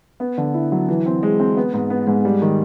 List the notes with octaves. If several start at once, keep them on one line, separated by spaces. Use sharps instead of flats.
B3
D3
E4
F#3
E3
C4
G#3
C4
B3
G#2
B3
G#2
G3
D#3